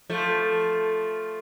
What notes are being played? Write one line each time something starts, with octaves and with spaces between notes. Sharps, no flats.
F3 A3